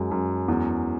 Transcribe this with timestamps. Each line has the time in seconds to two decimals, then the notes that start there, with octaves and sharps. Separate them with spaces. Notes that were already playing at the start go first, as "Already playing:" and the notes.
Already playing: F#2 G#3
0.11 F#2
0.48 E2